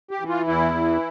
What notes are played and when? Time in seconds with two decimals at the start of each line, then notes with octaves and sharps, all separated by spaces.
0.11 G4
0.20 E3
0.29 F4
0.47 E2 E4
0.74 E3